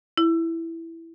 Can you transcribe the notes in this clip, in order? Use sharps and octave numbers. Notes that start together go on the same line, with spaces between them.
E4